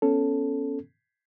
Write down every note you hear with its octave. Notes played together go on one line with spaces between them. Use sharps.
B3 C#4 A4